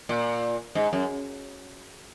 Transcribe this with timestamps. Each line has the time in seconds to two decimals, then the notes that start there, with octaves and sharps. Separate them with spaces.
0.09 A#2
0.75 G#2
0.93 F#2